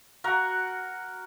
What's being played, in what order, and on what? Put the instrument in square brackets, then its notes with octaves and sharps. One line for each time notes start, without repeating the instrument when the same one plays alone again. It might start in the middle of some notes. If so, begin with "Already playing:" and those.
[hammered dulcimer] F#4 A#4 F#5